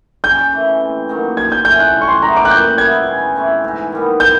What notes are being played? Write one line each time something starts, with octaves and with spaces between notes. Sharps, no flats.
C#3 G6
E3 A3
C3
D#3 F#3 A#3
F3 G#6
G6
A3 C#4 G6
F#6
G3
C#6
C6
B3 E4 G4 A#5
D6
F#6
A#2 G6
G3 B3 E4 G#6
C#3
E3 A3 C4
G#2
D#3 G3 B3
B2 G6